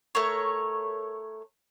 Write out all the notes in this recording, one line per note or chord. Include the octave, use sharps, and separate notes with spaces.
A3 A#4 C#5